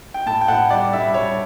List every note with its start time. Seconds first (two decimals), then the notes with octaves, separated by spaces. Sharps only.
0.14 G5
0.26 A2 A5
0.41 G5
0.48 A2 F#5
0.70 G3 D5
0.93 G3 E5
1.14 G3 C#5